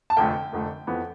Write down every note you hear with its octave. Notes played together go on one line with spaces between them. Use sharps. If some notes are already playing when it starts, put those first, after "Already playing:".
A5
F1 F2 D3 A3 G5
F1 F2 D3 A3
F2 E3 B3